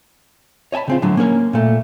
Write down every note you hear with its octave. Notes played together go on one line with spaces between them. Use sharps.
C#5 D#5 G#5 A5 B5
C#3 C4 F4
A2 D3 F#3
A#3 C#4 A#4 C#5
A#2 A3